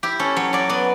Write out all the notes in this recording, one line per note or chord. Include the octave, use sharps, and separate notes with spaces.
E4 G4
C#4 A4
F#3 C#5
F#3 D5
B3 D5